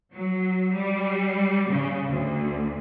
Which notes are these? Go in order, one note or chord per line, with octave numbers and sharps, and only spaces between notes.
F#3
G3
C#3
D2